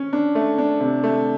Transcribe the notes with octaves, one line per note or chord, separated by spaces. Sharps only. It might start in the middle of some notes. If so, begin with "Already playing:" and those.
Already playing: C#4
D4
A3
D4
C3
A3